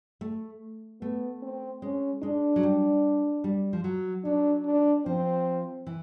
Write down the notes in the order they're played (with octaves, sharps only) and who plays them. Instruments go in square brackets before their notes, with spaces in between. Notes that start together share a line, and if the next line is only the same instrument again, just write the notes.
[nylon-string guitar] A3
[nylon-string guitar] A3 [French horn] B3
[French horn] C4
[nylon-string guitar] G#3 [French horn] C#4
[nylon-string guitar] G#3 [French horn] D4
[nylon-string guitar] F#3
G3
G3
F3
F#3
[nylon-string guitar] F#3 [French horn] D4
[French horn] D4
[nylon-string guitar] F3 [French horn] C4
[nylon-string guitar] E3